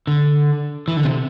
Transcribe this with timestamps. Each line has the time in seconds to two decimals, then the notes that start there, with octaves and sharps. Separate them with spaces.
0.07 D3
0.88 E3
0.97 D3
1.04 C3